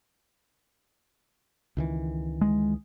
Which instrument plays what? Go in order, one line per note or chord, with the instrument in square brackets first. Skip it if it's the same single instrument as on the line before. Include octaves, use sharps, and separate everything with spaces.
[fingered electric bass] C#2 D#3 E3
[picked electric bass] G#3